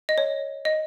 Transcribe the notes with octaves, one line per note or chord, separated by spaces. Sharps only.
D#5
C#5
D#5